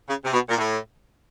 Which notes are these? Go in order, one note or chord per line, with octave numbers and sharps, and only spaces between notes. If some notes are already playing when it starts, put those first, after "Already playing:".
C#3
C3
B2
A#2
A2